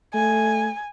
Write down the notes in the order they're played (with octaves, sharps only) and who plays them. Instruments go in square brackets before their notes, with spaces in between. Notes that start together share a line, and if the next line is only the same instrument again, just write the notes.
[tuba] A3 [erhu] G#5